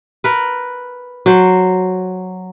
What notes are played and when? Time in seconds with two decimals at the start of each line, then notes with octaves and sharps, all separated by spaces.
0.24 A#4 B4
1.26 F#3 C5